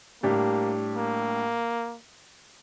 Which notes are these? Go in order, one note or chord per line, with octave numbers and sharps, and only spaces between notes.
A2 G3 A#3 D4 G4
A#3